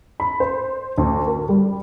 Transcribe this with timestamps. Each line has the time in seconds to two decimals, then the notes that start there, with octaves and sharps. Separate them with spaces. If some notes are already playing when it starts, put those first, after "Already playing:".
0.20 B5
0.40 C5
0.98 D2
1.27 A#4
1.49 G3